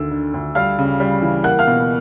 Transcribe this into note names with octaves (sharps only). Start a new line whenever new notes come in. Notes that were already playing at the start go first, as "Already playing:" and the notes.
Already playing: D2 D3 D#3 E6
D3
D2
G3 F5 F6
C#3
G3
E3
A#3 F#5 F#6
F5 F6
B2